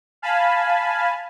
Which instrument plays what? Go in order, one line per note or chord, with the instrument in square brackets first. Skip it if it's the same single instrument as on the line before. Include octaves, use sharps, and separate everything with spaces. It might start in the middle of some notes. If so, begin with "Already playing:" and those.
[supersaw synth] F5 G#5 A5 B5